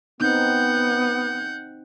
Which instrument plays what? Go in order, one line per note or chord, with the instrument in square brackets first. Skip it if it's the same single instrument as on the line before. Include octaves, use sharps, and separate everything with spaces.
[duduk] B3 [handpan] C4 D#4 [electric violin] F#5 G6